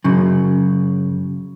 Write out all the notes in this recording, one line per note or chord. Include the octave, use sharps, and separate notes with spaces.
F#2 C#3